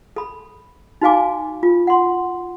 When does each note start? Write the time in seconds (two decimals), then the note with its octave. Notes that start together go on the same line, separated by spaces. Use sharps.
0.16 A4 B5
1.01 D#4 F#4 B4 F5 G#5 D6
1.63 F4
1.87 F#5 C6